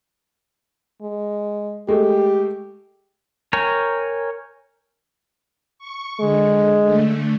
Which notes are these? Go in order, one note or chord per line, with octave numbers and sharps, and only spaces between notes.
G#3
G#3 A3 G4
A#4 C#5 G5 G#5 A#5
C#6
D3 G#3
D3 A3